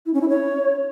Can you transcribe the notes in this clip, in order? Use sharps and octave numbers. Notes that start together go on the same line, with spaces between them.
E4
C#4
E4
C#5